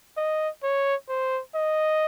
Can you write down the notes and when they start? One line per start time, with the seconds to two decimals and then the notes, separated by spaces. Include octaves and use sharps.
0.17 D#5
0.63 C#5
1.09 C5
1.55 D#5